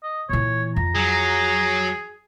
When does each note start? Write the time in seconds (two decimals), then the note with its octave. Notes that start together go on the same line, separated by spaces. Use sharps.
0.03 D#5
0.29 A#2 E3 C#5
0.76 F2 A#5
0.95 F#3 G#4